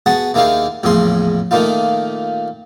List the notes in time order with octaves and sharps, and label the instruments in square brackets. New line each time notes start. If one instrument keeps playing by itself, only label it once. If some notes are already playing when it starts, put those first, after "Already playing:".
[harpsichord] B3 F#4 G#4 F#5 A5
D#2 A#3 D#4 E4 G#4 F5
A#1 E2 A2 C#3 G#4 C6
A#2 D#3 A3 A#3 D#4 F4